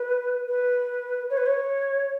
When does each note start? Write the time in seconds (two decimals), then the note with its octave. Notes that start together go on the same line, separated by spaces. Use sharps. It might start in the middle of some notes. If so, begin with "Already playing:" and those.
Already playing: B4
0.48 B4
1.30 C#5
1.37 B4
1.46 C#5